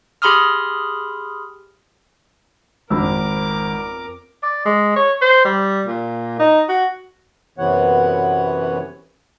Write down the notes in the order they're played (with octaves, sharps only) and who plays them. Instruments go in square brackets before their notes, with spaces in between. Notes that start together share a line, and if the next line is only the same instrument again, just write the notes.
[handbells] G4 G#4 B5 C6 D#6 F6
[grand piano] G#1 [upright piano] F2 B5 E6 [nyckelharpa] A#4 D6
[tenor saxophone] D5
G#3
C#5
C5
G3
A#2
D#4
F#4
[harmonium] F#2 C3 E3 B3 C#5 F#5